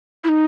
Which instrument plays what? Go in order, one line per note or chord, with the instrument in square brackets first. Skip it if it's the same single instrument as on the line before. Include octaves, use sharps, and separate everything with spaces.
[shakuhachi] E4
D#4